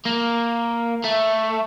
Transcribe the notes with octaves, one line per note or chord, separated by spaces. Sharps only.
A#3
A3